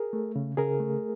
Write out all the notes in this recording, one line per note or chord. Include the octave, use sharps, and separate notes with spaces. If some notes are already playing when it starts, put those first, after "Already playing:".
Already playing: G#4 A#4
A3
C#3
C#3 G#4 A#4
A3